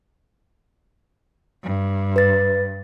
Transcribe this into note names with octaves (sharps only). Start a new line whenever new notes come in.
G2
B4 A6